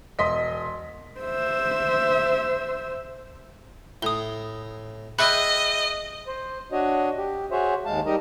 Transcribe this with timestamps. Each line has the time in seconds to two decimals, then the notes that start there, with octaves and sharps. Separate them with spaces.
0.19 E1 D#5 C6 B6
1.20 C5 E5
4.02 A2 D#6 G7
5.19 G#4 D#5 E5 G5 B5 F#6 G6
6.27 C5
6.72 D4 F#4 C#5 D#5
7.17 G4
7.51 F#4 G#4 C5 C#5 E5
7.86 D#2 G#3 F5 A5
8.06 G3 D#4 G4 A#4 D#5 A#5